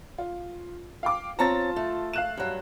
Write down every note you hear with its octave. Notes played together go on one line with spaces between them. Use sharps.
F4
F5 G5 D6
C4 F4 C#5 A5 A#5 A6
A3
F5 F#6 E7
G2 F#3